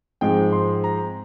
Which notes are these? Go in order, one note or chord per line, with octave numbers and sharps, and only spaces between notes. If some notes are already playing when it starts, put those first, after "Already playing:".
G#2 F3 G#3 C4 G5
C6
A#5